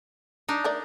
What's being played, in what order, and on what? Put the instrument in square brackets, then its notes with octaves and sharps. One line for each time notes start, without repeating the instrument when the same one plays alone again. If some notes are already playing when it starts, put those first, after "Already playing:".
[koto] D4 D#4
[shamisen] A3 A#4 D5